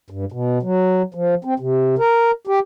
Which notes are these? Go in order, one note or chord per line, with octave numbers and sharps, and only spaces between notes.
G2
B2
F#3
F3
C4
C3
A#4
G4